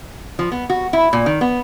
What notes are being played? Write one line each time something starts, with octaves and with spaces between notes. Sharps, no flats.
F3
B3
F#4
E4
A#2
D#3
B3